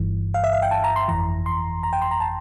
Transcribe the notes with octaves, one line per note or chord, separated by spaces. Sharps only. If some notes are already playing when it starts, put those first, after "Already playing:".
Already playing: G1 G2 E3
F5
E5
F5
G5
A5
A#5
C6
G1 F2 E3 A#5
C6
A#5
G5
C6
A#5
A5